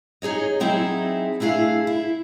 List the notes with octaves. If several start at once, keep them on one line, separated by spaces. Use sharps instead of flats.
D#4 G#4 C#5 D#5
F#3 C4 D#4 E4 G#4
A3 D4 E4 G#4 F5
E4